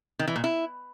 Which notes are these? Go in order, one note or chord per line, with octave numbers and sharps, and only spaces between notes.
D#3
E3
A#2
E4